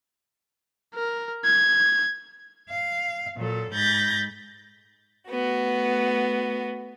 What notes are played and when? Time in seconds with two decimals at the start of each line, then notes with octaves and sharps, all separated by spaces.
0.94 A#4
1.44 G#6
2.69 F5
3.37 A#2 F#3 A4
3.73 G#2 B5 G6 A6 A#6
5.29 A3 B3 F#4